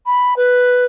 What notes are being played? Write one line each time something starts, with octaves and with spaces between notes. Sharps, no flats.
B5
B4